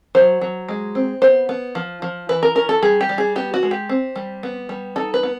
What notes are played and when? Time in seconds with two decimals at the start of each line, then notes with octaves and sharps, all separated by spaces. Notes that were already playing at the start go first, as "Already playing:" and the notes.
0.15 F#3 C5
0.41 F#3
0.69 G#3
0.95 C4
1.22 B3 C5
1.49 B3
1.75 F3
2.02 F3
2.29 E3 B4
2.43 A#4
2.55 C#4 A#4
2.69 A4
2.82 G3 G#4
3.01 G4
3.09 G3
3.18 G#4
3.36 B3 G4
3.54 F#4
3.63 G#3
3.71 G4
3.89 C4
4.16 G3
4.43 B3
4.69 G3
4.96 D#4 A4
5.14 B4
5.23 B3